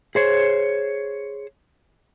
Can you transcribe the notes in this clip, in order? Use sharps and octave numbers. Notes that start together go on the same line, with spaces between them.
G#4 C5 C#5